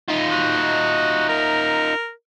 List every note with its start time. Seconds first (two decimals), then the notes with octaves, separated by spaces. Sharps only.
0.08 D#4 F4
0.31 F#4
1.29 A#4